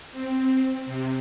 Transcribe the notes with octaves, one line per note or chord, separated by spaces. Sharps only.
C4
C3